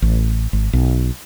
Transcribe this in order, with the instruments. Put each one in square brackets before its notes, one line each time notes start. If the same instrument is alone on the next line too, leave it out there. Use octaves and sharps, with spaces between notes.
[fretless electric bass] A1
G#1
B1